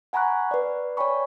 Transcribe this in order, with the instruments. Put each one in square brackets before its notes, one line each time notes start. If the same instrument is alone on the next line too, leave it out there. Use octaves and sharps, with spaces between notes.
[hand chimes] F#5 G#5 A#5 B5 C#6 F#6
B4 D5
C#5 D5 G5 G#5 B5 C#6